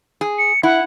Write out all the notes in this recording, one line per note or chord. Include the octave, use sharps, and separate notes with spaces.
G#4
C#7
E4 F#5